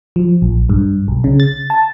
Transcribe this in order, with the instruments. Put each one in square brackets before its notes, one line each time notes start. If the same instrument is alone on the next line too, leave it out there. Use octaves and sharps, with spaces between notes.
[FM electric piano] F3
A#1
G2
B1
C#3
A6
A5